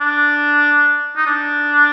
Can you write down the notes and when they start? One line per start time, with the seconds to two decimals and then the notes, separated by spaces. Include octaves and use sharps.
0.01 D4
1.17 D#4
1.26 D4